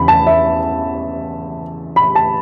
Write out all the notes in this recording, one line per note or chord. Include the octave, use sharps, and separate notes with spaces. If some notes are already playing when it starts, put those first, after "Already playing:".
Already playing: E2 C#3 B5
A5
E5
B5
A5